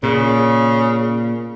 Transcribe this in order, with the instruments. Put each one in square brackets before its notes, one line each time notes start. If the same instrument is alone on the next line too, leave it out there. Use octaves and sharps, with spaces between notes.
[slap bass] A#2 [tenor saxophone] C#3